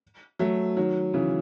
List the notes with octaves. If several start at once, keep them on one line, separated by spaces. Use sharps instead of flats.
F#3 A3
D#3 F#3
C#3 E3